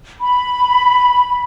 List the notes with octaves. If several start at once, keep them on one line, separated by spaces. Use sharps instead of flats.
B5